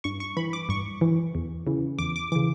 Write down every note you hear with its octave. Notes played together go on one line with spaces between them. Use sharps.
G2 C#6
C#6
E3 B5
D6
G2 C#6
E3
E2
C#3 E3
E2 D6
D6
C#3 E3 D6